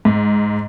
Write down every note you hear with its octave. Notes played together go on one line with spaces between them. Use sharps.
G#2